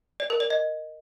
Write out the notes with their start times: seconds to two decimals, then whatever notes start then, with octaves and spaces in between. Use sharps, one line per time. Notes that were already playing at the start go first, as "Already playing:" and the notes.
0.20 D5
0.30 A#4
0.40 D5
0.50 D#5